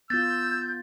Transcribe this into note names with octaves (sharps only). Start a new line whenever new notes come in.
B3 F4 E6 G6 A6